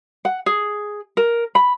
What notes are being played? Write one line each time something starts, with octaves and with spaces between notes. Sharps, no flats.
F#5
G#4
A#4
B5